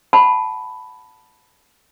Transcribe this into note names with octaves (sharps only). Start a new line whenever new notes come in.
F#5 A5 B5